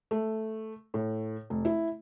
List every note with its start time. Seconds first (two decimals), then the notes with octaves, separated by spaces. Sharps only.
0.11 A3
0.94 A2
1.50 F1
1.65 E4